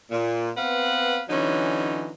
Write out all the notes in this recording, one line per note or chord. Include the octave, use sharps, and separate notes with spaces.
A#2
B3 C4 B4 F5 F#5
D3 E3 F#3 C#4 D#4